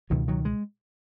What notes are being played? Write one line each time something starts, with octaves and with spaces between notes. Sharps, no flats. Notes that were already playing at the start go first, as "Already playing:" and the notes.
C#2 B2 D#3 F#3
D#3 F#3
G#3